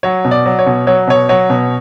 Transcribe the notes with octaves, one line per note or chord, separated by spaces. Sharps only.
F#3 C#5
B2
D5
F#3
C#5
B2
F#3 C#5
B2 C#5
F#3 C#5
B2